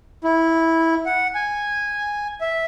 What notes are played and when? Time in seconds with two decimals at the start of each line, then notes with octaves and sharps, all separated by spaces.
0.24 E4
1.06 F#5
1.35 G#5
2.41 E5